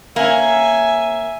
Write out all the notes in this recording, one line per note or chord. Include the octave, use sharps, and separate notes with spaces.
A#3 C#4 E5 G#5